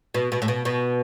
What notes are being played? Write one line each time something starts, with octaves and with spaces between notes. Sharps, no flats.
B2
B2
A2
B2
B2